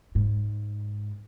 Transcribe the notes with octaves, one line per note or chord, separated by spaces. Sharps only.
G#2